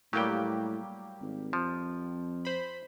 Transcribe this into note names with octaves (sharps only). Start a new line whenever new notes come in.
A2 F#3 G3 A#3 G4 G5
G#1
F2 F3
C5 B5